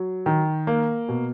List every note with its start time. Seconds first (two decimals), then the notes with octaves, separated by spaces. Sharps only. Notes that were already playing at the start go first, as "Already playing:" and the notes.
Already playing: F#3
0.26 D#3
0.67 A#3
1.09 B2